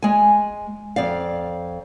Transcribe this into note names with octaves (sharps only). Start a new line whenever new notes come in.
G#3 G#5
F2 D5 F5